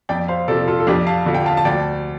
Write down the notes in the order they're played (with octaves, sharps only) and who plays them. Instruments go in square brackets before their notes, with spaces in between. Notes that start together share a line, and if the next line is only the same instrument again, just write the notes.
[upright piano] F2 D5 G5
C5 F5
C3 F3 A4 D5
F4 A4
A4
F2 D4 G4
F5 A5
D3 F3
G5
F5 A5
A5
D2 D5 G5